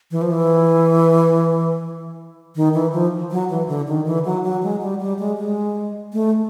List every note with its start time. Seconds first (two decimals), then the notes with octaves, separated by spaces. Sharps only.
0.11 E3
0.22 F3
0.31 E3
2.56 D#3
2.74 E3
2.93 F3
3.31 F#3
3.50 E3
3.68 D3
3.88 D#3
4.06 E3
4.25 F#3
4.44 F#3
4.63 G#3
4.81 G3
5.00 G3
5.19 G#3
5.38 G#3
6.13 A3